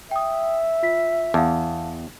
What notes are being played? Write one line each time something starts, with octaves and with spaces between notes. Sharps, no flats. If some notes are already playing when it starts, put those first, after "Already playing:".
E5 G5 D#6
F4 B6
E2 F5 A5